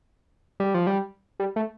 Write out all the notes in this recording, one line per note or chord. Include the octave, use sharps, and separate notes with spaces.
G3
F3
G3
G3
A3